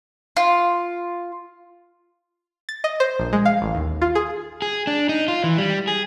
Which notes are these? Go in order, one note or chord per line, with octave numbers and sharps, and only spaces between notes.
F4
A6
D#5
C5
A#1
G#3
F5
A1
D#2
F4
G#4
G#4
D4
D#4
F4
E3
G3
G#4